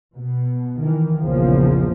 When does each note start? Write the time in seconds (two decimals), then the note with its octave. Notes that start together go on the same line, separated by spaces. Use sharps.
0.14 B2
0.80 D#3 E3
1.20 A#1 E2 C#3 F3 A#3